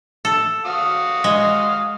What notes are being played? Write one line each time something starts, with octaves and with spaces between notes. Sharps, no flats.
A4
F#4 F5 D#6
G#3